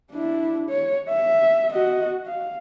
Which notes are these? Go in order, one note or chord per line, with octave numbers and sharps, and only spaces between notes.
D4 E4
C#5
E5
F#4 D#5
F5